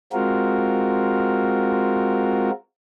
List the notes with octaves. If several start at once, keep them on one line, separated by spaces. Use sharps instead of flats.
G#3 C4 F4 F#4 A#4